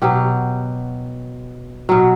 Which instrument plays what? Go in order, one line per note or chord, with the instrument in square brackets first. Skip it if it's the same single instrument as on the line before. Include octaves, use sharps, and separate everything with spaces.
[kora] B2 F#3 G4
B2 F#3 F#4